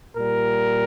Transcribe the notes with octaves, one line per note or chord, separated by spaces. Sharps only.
A#2 G3 A#4